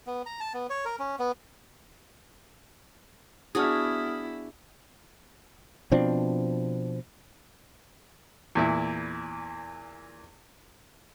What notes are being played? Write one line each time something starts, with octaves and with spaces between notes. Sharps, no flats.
B3
A#5
A5
B3
C#5
A#4
C#4
B3
B3 D4 E4 F#4 G#4 D#6 F6
B2 F3 C4 D4
E2 A#2 E4